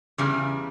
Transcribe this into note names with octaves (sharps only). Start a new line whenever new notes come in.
E2 C#3 G3